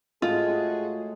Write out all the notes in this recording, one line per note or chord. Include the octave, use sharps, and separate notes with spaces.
A2 G#3 F4 F#4 G#4